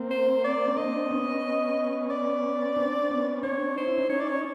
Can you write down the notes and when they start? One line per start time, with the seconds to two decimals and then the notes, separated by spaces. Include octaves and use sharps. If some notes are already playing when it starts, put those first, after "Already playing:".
Already playing: A#3 C4
0.11 C5
0.44 D5
0.68 C#4
0.77 C4 D4 D#5
1.11 B3 C#4
2.10 D5
2.76 C4 D4
3.09 B3 C#4
3.43 C4 D4 C#5
3.76 D#4 C5
3.88 E4
3.98 C#4 D#4
4.09 C#4 D#4 C#5
4.20 D5
4.29 C#5